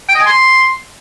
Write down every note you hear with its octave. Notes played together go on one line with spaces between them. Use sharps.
G5
D#5
G#5
C6